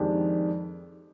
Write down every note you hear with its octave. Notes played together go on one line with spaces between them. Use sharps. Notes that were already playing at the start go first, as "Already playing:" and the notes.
Already playing: F2 D#3 G#3 D4 G4